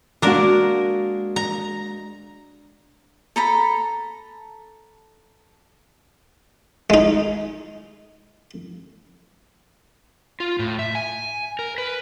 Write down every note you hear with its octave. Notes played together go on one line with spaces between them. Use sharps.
G#3 A#3 D4 F#4 A#4
A#5
A4 A#5 B5
G#3 D#4
F4
A2
E5
G#5
A#4
B4